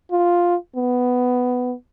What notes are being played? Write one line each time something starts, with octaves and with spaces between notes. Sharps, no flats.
F4
B3